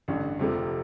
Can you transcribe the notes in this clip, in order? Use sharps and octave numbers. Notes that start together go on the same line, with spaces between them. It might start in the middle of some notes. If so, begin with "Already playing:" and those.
A1 G2 D3
F1 F2 C3 F3